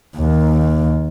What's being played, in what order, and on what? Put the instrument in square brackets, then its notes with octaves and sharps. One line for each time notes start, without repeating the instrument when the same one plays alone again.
[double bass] D#2